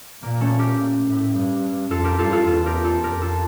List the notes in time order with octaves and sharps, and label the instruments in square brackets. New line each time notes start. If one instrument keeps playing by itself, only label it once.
[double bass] A#2 [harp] A#3
[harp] A3 C#4
G4 A#4
[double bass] A#2
A2
G2
[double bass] F2 [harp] F4 A4
[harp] G4 A#4
[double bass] G2 [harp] F4 A4
[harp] F4 A4
[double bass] E2 [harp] F4 A4
[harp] G4 A#4
F4 A4
[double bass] F2 [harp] G4 A#4
[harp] F4 A4